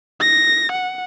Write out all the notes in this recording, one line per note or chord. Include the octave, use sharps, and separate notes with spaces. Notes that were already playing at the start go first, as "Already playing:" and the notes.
A#6
F#5